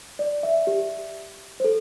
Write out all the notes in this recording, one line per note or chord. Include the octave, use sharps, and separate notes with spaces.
D5
E5
G4
C5
A4